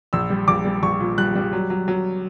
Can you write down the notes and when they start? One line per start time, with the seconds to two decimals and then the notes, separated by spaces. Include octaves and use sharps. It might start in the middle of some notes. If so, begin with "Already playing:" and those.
0.13 A#1 E6
0.30 G3
0.48 A#1 D6
0.65 G3
0.82 A#1 C#6
1.00 A#2
1.18 G3 F#6
1.35 G3
1.53 F#3
1.70 F#3
1.88 F#3